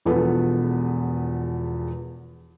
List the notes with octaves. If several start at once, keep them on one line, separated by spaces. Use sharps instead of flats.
E1 E2 F3 B3 A4 B4